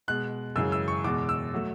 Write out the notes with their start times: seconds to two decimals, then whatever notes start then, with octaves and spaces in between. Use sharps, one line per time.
0.08 B2 G#3 F#6
0.56 F#2 C#3 E3 G#3 E6
0.72 E6
0.88 C#6
1.04 E2 B2 G#3 D6
1.29 E6
1.54 F#3 A3